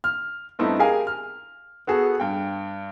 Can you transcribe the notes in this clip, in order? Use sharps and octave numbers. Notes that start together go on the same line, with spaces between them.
F6
G2 A3 B3 C4 D#4 E4
G4 G#4 A#4 F5 G#5
F6
B3 F#4 G#4 A4
G2 G5